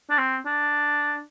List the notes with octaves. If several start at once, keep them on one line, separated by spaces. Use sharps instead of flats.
D4
C4
D4